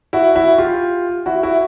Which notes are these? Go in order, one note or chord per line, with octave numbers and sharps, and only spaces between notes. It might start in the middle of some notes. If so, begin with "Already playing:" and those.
E4 F#4
E4 F#4
F4 G4
E4 F#4
E4 F#4